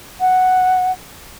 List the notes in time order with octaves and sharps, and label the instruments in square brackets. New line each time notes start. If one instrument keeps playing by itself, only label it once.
[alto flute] F#5